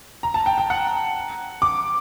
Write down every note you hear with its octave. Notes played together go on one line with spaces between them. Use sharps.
A#5
A5
G5
G5
F#5
D6